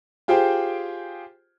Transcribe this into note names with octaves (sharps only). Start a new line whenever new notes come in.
F4 G4 G#4 C5 G5